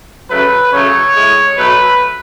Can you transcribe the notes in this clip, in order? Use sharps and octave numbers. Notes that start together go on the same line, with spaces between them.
C#3 F#3 A3 B4
C#3 F#3 A3 C#5
A2 G#3
B2 F#3 A3 B4